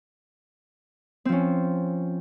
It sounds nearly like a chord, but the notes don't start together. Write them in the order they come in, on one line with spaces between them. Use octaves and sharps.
C4 F3 C#4